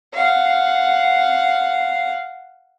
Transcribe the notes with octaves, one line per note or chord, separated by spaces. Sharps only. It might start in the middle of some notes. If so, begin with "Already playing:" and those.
F5 F#5